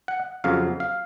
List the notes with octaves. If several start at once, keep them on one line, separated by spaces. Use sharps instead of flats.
F#5
F2 C#3 F#3 F5
F5